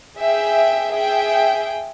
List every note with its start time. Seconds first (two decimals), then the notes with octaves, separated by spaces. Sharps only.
0.18 G#4 E5 G5
0.93 G#4 E5 G5